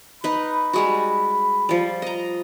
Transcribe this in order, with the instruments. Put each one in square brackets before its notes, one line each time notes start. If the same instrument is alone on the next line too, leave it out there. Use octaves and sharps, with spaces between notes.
[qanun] D#4 B4 [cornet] B5
[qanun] G3 G#3 F#4
F3 G3
D#5 A#5